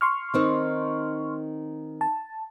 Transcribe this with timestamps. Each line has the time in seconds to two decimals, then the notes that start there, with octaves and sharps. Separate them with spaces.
0.01 C6 C#6 F6
0.34 D#3 C4 D#4
2.01 A5